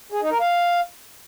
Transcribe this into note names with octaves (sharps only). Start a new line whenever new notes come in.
G#4
D#4
A#4
F5